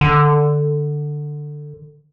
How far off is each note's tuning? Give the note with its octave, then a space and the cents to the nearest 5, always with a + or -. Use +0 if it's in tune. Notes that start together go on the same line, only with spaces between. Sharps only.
D3 +10